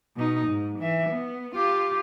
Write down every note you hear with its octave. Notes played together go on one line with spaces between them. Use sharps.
B2 D#4
G#2
E3 E5
B3
F4 G4